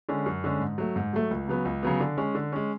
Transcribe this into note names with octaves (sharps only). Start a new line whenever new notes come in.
D3 G#3 C#4
F#2
D3 G#3 C#4
G#2
F#3 A3
G#2
F#3 A3
C#2
C#3 F#3 B3
C#2
C#3 F#3 B3
D3
G#3 C#4
D3
G#3 C#4